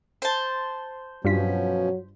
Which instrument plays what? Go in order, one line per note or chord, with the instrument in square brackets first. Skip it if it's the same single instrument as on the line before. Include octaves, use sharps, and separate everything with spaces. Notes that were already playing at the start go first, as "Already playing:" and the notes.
[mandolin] C5 A5
[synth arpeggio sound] G2 F4 B6 [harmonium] B2 F3 C#4 [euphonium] F#3